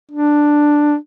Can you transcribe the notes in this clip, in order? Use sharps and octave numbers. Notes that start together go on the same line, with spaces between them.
D4